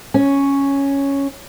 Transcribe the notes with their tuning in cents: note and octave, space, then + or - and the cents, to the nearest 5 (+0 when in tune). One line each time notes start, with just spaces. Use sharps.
C#4 +0